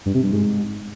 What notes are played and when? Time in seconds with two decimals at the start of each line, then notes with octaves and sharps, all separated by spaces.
0.06 G2
0.14 C3
0.23 G2
0.32 G#2